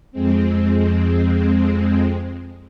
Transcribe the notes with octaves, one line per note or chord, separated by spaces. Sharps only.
F2 G#3 C4